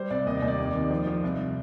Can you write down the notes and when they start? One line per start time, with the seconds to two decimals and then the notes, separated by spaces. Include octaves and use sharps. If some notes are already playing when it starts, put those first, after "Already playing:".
Already playing: G3 C5
0.10 C2 D5
0.26 D#2 D#5
0.37 D5
0.42 D#2
0.48 D5
0.58 F2 D5
0.75 D#3
0.91 F3
1.07 F3
1.24 C2